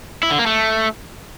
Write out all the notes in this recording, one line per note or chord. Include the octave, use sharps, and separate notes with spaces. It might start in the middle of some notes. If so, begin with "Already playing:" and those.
E4
D3
A#3
A3